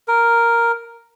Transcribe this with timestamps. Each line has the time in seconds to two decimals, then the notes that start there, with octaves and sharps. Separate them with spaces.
0.08 A#4